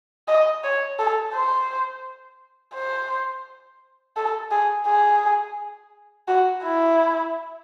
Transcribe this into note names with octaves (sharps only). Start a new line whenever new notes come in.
D#5
C#5
A4
C5
C5
A4
G#4
G#4
F#4
E4